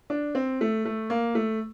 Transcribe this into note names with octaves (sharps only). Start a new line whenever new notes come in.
D4
C4
A3
A3
A#3
A3